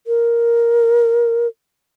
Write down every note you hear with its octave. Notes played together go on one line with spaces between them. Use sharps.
A#4